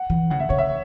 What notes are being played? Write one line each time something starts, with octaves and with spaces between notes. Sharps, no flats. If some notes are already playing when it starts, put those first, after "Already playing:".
Already playing: F#5
E3
C#3 F#5
E5
C#3 C#5
E5